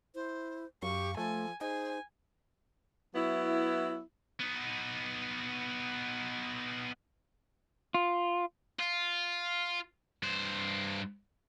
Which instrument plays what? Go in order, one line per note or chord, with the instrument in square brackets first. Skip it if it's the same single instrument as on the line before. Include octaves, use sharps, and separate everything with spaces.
[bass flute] E4 [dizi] C5
[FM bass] F#2 [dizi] G4 [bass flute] F5 [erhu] C#6
[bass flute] F3 [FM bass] A3 [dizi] A4 [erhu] G#5
[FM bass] D#4 [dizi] G#4 [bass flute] C5 [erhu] G#5
[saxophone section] F#3 B3 E4
[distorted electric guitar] B3 D#4
[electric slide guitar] F4
[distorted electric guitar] F4
G2 C5